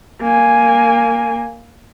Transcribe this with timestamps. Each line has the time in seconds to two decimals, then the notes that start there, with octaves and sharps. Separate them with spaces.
0.22 A#3 G#5